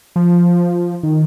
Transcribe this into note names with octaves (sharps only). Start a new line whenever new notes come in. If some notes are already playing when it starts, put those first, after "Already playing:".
F3
D#3